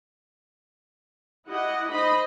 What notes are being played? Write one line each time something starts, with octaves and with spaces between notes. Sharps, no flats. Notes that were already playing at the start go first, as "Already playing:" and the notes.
E4 G4 D#5 F#5
D#4 C5 D#5 B5